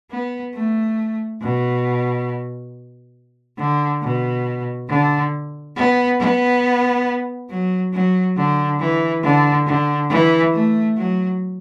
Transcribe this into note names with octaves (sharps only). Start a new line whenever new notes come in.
B3
A3
B2
D3
B2
D3
B3
B3
F#3
F#3
D3
E3
D3
D3
E3
A3
F#3